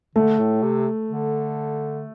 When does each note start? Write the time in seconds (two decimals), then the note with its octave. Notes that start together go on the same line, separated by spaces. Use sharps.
0.15 D3 A3
0.39 A2
0.62 C3
1.10 D3